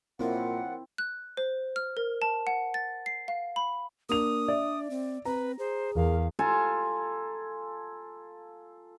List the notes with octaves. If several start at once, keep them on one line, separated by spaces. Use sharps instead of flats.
F#2 A#2 F3 A#3 C4 E4 F#5
F#6
C5
F6
A#4
A5
F#5
A6
C7
F5
B5
A#3 D4 D#6 F7
D5 E5
C4
C4 B4 A#5
G#4 C5
E2 A#4 F5
F4 A4 G#5 A#5